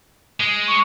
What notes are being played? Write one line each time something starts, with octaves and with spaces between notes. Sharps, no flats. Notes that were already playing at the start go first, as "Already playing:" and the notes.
G#3
C#6